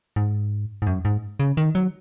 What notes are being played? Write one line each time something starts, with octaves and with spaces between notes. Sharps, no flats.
G#2
G#2
F#2
G#2
C#3
D#3
F#3